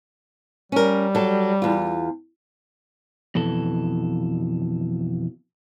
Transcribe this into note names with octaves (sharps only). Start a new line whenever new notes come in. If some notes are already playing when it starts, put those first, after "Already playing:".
G3 C#4 A#4
F#3 A4
E2 F4
F2 B2 E3 A4